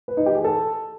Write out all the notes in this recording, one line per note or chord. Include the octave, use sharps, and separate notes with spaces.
B4
D#4
G4
G#4
A4